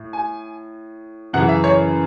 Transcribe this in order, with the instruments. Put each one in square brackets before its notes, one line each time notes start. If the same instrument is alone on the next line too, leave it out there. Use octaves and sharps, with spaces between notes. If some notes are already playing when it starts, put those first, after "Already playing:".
Already playing: [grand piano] A2
G#5
F#2 C#3 E3 F#5
E5
C#5